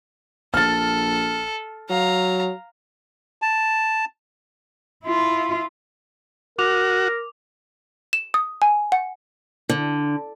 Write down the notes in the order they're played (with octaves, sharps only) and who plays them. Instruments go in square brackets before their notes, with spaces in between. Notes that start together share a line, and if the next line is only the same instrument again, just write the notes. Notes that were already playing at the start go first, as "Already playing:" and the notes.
[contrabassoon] A#1 [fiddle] A4 [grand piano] F6 A6
[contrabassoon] F#3 [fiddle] F5 A#5
[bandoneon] A5
[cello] E4 F4
[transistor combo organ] F#4 [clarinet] A#4 [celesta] D6 F7
[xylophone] E7
D#6
G#5
F#5
[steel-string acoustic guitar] D3